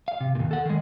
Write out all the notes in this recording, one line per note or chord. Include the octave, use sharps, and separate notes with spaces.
F5
C3
D#2 A#2
A4 F#5
D#3 G#3